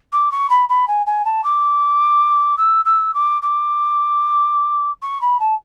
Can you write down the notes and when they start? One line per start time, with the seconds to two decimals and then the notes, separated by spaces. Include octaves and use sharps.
0.12 D6
0.31 C#6
0.50 B5
0.69 B5
0.88 G#5
1.06 G#5
1.25 A5
1.44 D6
2.57 E6
2.85 E6
3.14 D6
3.42 D6
5.02 C#6
5.21 B5
5.40 A5